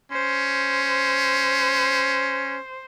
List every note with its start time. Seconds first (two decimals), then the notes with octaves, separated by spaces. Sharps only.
0.12 C#4 C5